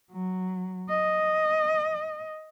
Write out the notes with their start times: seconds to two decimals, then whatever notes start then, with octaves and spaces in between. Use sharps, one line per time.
0.11 F#3
0.88 D#5